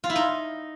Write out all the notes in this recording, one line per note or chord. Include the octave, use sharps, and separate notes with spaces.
F4
E4
D#4